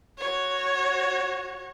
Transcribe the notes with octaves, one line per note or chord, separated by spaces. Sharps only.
F#4 C#5